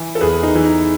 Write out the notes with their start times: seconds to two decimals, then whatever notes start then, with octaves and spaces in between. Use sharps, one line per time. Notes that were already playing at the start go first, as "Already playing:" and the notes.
Already playing: E3
0.15 A4
0.21 E2 G#4 B4
0.43 D#4
0.55 E3
0.66 D#4